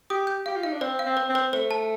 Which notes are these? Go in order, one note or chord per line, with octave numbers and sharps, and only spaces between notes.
G4 D#6
G6
G4 F5
F4
D#4 F5
D4
C4 C5
F5
C4
C5
C4
C5
A3 C5
A5